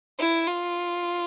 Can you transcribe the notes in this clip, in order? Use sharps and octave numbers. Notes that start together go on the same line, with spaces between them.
E4
F4